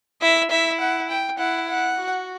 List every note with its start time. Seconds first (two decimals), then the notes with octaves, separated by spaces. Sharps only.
0.21 E4 E5
0.51 E4 E5
0.80 F#5
1.09 G5
1.38 E4 F#5
1.69 F#5
1.97 F#4